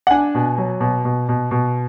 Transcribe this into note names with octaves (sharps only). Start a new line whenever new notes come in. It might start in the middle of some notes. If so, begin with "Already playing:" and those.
F#5
D4 G#5
B2
F#3
B2
B2
B2
B2